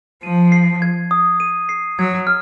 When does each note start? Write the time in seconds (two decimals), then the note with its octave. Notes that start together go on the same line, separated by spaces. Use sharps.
0.23 F3 D#7
0.52 C7
0.82 G#6
1.11 D#6
1.40 D#7
1.69 C7
1.99 F#3 G#6
2.27 F6